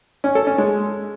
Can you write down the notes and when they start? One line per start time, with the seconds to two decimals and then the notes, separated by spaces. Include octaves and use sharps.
0.24 C#4
0.35 A4
0.47 C#4
0.58 G#3